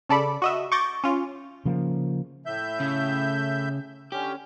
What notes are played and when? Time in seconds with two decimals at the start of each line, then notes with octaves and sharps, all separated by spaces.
0.09 C#3 A4 D5 B5
0.42 F#4 D#5 E5
0.72 C#6 D6 G6 A6 A#6
1.04 C#4 F4
1.66 C#3 F3 A#3
2.46 A2 E5 G6
2.80 C#3
4.12 D3 C#4 G4